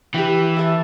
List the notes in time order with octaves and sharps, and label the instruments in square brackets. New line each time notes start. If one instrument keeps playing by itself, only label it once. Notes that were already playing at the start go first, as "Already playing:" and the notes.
[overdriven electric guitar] E3 [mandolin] G4 E5 G5
[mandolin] E4 A4 E5 A5